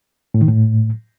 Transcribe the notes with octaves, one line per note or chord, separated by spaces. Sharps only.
A2
D#3
A2